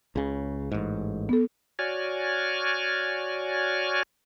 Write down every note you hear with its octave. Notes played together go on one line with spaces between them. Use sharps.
C#2 C#3
A1 G#2
B3 A4
F#4 C#5 D5 G#5 F6